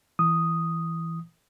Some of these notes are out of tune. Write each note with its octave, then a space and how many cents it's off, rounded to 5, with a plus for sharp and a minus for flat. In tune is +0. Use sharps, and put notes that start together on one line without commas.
E3 +0 D#6 +0